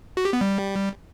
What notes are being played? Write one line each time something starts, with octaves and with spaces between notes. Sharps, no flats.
F#4
G4
B3
G3